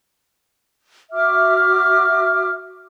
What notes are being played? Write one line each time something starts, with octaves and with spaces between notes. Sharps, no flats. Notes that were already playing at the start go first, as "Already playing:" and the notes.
F#4 E5 D6 F6